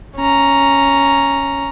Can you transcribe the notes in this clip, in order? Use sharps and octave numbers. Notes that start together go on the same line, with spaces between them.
C#4 A#5